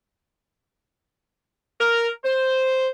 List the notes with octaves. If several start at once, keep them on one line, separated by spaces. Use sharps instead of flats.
A#4
C5